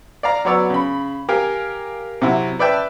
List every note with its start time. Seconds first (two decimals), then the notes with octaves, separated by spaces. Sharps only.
0.23 D5 F5 A#5
0.45 F#3 B3 C#5 D5 E6
0.70 C#3 B5
1.29 G4 A#4 F5 G#5
2.22 C3 F#3 E4 F#4
2.59 B4 D5 E5 G5 A5